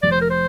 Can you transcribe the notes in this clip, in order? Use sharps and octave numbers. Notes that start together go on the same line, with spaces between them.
F1 D5
C5
A#4
C5